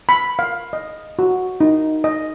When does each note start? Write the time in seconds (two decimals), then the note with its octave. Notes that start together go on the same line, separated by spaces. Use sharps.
0.09 B5
0.39 F5
0.73 D#5
1.19 F#4
1.61 D#4
2.04 D#5